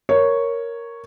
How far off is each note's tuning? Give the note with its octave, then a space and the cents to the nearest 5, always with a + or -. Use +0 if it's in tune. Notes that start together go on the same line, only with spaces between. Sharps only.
A#4 +0 C#5 +0